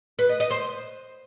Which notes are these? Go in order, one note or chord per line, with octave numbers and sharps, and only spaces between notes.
B4
D#5
D#5
C5